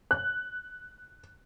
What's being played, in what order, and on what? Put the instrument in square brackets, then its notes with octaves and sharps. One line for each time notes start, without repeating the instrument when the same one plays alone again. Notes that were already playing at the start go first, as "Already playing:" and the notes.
[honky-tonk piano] F#6